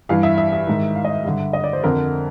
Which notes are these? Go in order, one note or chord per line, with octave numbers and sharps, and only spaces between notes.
G2 E3 F5
E5
E5
E5
G#2 D#3
F5
D#5
E5
G2 D3
D#5
D5
C5
F2 D3 A#4